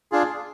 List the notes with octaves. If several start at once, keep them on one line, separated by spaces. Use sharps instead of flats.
D4 F4 G#4